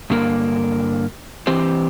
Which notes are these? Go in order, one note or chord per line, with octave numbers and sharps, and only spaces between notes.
G2 D3 A#3 A#4
E3 C4 G4 C5